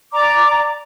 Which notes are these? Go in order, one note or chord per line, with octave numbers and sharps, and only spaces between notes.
D5 A#5 D6